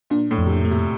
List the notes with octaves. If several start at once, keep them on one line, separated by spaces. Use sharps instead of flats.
A#2 D4
A2
F2
C3
A#2
A3
C3